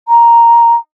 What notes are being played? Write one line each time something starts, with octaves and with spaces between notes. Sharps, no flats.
A#5